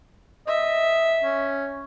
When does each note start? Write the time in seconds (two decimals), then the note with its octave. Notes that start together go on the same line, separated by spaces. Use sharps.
0.47 D#5 E5
1.24 C#4